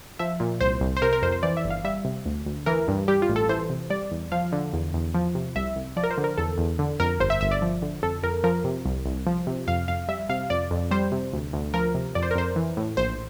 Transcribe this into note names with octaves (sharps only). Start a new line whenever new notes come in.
F3 E5
A#2
C2 C5
C2
C5
C3 A#4
A#4
F2 C5
C5
E3 D5
E5
G1
F5
G3 E5
C3
D2
D2
E3 A#4
G2
G3 G4
F4
A1
A4
E3 C5
C3
G3 D5
E2
F3 F5
D3
E2
E2
F3
C3
C2 E5
C2
F3 D5
A#4
C5
D3
A#4
E2 A4
E2
D3
F2 A#4
G1 C5
E5
G1 E5
D5
F3
D3
F2 A4
F2 A#4
F3 A#4
C3
C2
C2
F3
C3
F2 F5
F2 F5
G3 E5
C3 F5
F2 D5
F2
G3 C5
C3
D2
D2
F3 A#4
C3
F2 D5
C5
A#4
F2 C5
E3
A2
A#1 C5